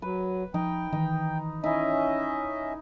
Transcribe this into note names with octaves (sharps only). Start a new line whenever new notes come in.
F#3 B4
F3 D#4 G5
D#3 E3 D#4
C#4 D#4 E4 D#5 E5